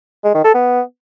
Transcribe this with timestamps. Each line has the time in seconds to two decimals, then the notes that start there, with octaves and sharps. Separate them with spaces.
0.24 G#3
0.34 D#3
0.44 A4
0.54 B3